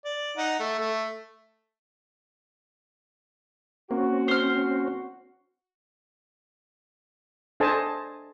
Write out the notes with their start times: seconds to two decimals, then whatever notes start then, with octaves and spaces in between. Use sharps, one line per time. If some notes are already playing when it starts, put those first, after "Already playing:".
0.05 D5
0.38 D#4 F#5
0.60 A3
0.79 A3
3.91 A#3 C4 C#4 F#4
4.28 C5 F6
7.60 D4 A4 C5 D#5 G#5 A5